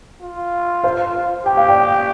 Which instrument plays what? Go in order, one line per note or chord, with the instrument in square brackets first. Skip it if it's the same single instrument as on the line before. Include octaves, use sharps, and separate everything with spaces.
[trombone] F4
[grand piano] C5 F5
[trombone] G4 [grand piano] G5
[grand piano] F5
D5 G5